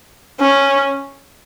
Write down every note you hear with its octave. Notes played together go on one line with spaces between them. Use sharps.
C#4